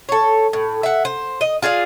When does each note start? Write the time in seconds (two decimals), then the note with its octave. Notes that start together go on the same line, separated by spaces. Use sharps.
0.09 A4 C#5
0.53 A2
0.83 E5 F#5
1.05 C5
1.41 D#5
1.62 F4 G#4 D5 F5